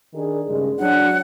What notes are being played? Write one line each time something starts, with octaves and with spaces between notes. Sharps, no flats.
D#3 D4 G#4
G2 C#3 G#3
F#3 D4 F#5